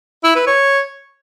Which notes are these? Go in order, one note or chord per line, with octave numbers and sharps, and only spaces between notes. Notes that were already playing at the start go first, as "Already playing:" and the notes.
E4
B4
C#5